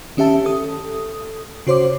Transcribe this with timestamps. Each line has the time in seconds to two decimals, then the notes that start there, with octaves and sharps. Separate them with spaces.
0.17 D#3 C#4 G4 E5 A5
0.46 A4 D#6
1.67 C#3 F#4 C5 C#5 D6